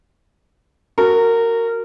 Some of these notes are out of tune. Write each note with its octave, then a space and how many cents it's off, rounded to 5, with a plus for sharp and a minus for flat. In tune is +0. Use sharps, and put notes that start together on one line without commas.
F#4 +0 A#4 -20